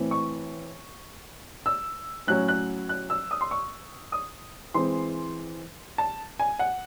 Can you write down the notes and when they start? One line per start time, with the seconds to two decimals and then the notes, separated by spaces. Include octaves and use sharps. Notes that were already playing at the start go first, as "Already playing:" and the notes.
Already playing: A2 E3 C4
0.11 C#6
1.66 E6
2.27 A2 F#3 C#4 F#6
2.48 F#6
2.89 F#6
3.10 E6
3.31 D#6
3.41 C6
3.51 C#6
4.12 D#6
4.74 E3 G#3 C4 C6
5.98 A5
6.39 G#5
6.59 F#5